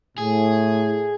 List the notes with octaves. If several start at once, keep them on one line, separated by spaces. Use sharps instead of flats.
A2 G#4